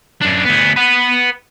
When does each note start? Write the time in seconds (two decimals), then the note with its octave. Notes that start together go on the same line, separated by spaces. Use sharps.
0.22 F#2 D4
0.45 D2 B3
0.76 B4 F#5